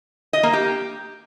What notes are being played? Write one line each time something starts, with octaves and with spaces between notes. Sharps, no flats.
D#5
A#3
G4